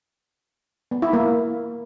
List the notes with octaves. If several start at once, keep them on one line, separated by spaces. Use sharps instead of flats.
B3
E4
A#3